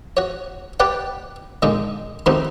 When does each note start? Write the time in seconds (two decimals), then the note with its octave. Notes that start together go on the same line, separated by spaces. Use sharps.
0.17 F#4 C#5
0.80 G4 B4 D5 F#5 G5
1.62 A#2 D3 G#3 A#3 D#4
2.26 D#3 G3 A3 C4 D#4 F#4